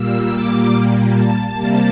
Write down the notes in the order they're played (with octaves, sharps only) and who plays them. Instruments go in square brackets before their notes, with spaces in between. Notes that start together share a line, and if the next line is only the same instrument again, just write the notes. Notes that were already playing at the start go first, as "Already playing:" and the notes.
Already playing: [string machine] A#2 G3 A#3 E6
D6
A5
C3 G3 A#3